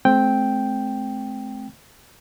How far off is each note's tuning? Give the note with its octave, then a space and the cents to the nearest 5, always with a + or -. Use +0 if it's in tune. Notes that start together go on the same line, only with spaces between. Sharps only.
A3 -40 C4 +0 G5 +0